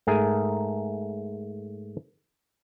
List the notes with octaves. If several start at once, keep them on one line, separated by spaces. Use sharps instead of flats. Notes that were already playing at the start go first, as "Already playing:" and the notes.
G#2 A3 G#4 A#4 G#5